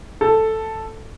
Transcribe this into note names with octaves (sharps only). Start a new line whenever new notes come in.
A4